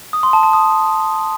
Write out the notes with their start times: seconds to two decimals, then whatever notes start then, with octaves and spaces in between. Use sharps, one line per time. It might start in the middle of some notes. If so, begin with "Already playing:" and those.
0.13 D#6
0.23 C6
0.33 A5
0.43 A5
0.53 D#6